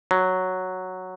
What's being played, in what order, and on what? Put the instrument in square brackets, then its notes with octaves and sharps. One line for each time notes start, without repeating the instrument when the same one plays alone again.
[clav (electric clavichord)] F#3